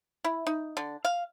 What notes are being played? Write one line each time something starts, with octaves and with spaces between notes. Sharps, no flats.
E4
D#4
D3
F5